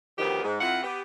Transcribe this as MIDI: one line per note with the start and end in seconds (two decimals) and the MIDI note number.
0.18 0.43 38
0.18 0.43 51
0.18 0.43 53
0.18 0.43 59
0.18 0.43 67
0.44 0.57 44
0.61 0.79 41
0.61 0.79 64
0.61 0.79 65
0.61 0.79 78
0.83 1.01 59
0.83 1.01 67